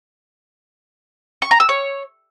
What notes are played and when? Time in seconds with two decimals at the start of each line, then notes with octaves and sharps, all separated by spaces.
1.42 C#6
1.51 A#5
1.60 E6
1.69 C#5